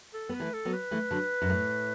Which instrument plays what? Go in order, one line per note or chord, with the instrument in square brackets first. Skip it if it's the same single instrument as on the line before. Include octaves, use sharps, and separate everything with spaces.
[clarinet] A4
[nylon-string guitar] B3 [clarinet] B4
[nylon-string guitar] E3 A3
[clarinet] A4
[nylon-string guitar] F#3 B3
[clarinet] B4
[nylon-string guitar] E3 A3
D3 F#3
F#2
A2